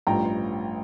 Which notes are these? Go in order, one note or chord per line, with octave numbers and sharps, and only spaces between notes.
A1 G2 F3 G5 A#5